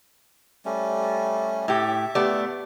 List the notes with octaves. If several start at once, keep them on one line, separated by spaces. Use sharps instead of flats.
G3 A3 C#4
A2 G4 E5
A3 B3 G4 D5